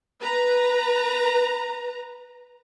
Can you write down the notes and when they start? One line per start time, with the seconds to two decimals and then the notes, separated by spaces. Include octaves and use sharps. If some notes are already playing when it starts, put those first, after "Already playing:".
0.21 B4 A#5